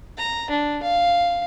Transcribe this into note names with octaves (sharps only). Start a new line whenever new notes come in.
A#5
D4
F5